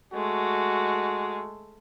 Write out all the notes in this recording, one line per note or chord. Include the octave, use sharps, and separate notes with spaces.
G#3 A3 F#4